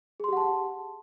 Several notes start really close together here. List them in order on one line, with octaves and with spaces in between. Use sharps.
G#4 C6 G4 F#5 A5